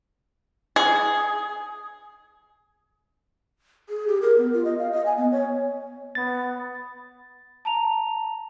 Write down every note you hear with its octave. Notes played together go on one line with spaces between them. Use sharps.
G#4
G#4
G4
A#4
B3
F4
D#5
F5
D#5
G#5
B3
C#5
B3 A6
A5 A#5 F7